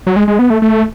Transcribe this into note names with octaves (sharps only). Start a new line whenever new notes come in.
F#3
G#3
G#3
B3
A3
A3